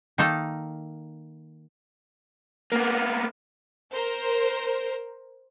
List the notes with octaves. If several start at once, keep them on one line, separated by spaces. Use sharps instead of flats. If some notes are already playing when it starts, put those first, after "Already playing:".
D#3 A#3 D#4 A4
A#3 B3
A#4 C5